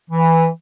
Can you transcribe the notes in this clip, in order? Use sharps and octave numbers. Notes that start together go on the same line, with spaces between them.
E3